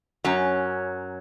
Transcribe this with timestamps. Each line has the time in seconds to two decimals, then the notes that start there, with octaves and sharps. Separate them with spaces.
0.24 F#2 F#3 C#4